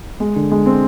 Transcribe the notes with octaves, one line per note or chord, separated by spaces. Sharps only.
G#3
D3
G#3
C4